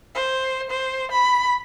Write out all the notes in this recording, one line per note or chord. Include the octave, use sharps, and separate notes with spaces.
C5
C5
B5